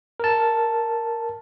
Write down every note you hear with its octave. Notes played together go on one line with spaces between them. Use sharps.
A#4 A5